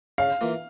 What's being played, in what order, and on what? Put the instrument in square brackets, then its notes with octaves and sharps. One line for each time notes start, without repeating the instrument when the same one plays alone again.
[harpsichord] C#3 [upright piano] F5
[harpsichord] E3 A#3 F4